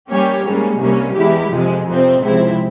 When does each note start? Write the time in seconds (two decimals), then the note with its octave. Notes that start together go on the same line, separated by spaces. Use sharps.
0.10 G3 A#3 C#4 G4 C#5
0.46 G#2 G3 A#3 C#4
0.81 C2 C3 G3 A#3 C#4
1.16 E2 E3 G#3 E4 G4
1.52 F2 C3 F3 G#3
1.88 F2 C3 F3 C4
2.23 C#2 C3 F3 C4 E4